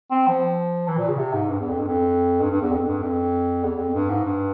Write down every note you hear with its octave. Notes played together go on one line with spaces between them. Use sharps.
C4
F3
E3
A#2
C#3
C3
G#2
G2
E2
F2
G2
F2
G2
G2
E2
F2
G2
F2
E2
F2
G2
G#2
G2